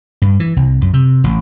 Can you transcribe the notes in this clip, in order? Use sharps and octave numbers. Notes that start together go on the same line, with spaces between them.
G2
E3
C2
F#2
C3
A1